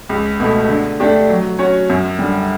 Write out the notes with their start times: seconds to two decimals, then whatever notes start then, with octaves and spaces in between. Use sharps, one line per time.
0.09 C#2
0.40 B2 A3
0.69 D3
1.00 A3 D4 G4
1.30 F#3
1.59 C#4 F#4 C#5
1.90 F#2
2.19 D3 G3